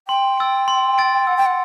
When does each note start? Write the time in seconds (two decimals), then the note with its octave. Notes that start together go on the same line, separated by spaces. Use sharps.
0.08 G5 C6
0.38 E6 A6 D7
0.68 C6
0.98 E6 A6 D7
1.27 F#5 E6
1.37 G5
1.46 F#5